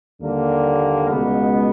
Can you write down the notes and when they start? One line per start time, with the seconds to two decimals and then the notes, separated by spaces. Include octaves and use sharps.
0.20 D#2 D3 G3 A#3
1.09 C#2 B2 G#3 B3